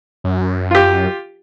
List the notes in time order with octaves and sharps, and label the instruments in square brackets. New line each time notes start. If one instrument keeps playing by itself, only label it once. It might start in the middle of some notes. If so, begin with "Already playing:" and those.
[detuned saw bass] F#2
[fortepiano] F4 G4